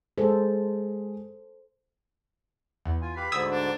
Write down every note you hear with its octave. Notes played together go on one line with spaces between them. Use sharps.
G#3 A4 C5
E2
F4 G#5
G4 B4 F5 B5
D2 G#2 D3 D#6 E6 G#6
D4